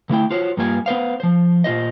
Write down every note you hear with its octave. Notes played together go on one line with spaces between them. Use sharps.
D3 A3 E4 G5
F4 F#4 C5 C#5
G2 G3 A#3 F4 F#4 G#5
B3 B4 C5 F5
F3 C5
A#2 F4 C5 D#5